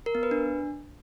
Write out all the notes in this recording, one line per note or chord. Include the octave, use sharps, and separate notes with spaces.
A#4
B3
B4
D4